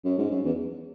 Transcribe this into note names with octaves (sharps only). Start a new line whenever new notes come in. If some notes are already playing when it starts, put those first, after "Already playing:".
F#2
G#2
F#2
E2